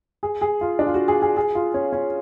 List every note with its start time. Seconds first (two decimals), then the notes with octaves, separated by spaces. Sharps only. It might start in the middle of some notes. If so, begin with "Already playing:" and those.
0.23 G#4
0.42 G#4
0.61 F4
0.79 D4
0.87 F4
0.94 F#4
1.08 G#4
1.22 G#4
1.37 G#4
1.55 F4
1.74 C#4
1.92 C#4